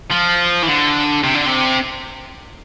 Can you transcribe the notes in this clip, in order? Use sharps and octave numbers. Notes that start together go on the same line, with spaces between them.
F3
E3
D3
C3
D3
C3